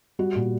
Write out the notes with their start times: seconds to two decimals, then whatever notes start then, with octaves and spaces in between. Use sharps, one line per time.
0.19 G3 F#4
0.35 A#2